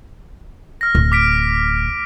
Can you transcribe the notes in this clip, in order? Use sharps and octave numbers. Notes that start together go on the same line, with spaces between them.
F6 A#6
D1
D6 B6 D7